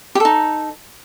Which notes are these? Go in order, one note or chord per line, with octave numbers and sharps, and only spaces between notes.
D#4 G4 A4